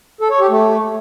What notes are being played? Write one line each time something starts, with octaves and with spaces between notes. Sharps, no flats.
A4
C#5
G4
A3